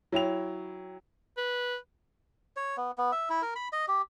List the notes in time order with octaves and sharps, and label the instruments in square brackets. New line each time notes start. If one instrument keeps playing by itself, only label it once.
[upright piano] F#3 E4 G5 F7
[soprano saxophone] B4
[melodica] C#5
B3
B3
E5
E4
A#4
B5
D#5
G4